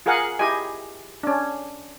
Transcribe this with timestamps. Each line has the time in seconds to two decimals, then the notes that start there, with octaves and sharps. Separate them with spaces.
0.06 F4 G#4 A#4 F5 F#5 G#5
0.39 E4 G4 G#4 D#5 G#5
1.23 C#4 D4